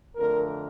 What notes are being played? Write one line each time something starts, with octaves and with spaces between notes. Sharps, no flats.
F2 D3 A3 A#4